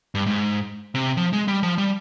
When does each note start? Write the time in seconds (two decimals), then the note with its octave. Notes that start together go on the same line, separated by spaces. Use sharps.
0.15 G2
0.26 G#2
0.95 C3
1.17 F3
1.33 G#3
1.48 G3
1.63 F3
1.78 G3